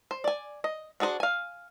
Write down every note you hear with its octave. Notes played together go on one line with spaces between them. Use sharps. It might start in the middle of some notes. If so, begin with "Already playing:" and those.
C5
D5 G#5
D#5
D4 F#4 G#4 B4 C5
F5 G#5